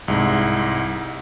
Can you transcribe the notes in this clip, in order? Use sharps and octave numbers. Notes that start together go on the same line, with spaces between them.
C2 G#2